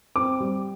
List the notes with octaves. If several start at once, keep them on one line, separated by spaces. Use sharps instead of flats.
C4 D6
G3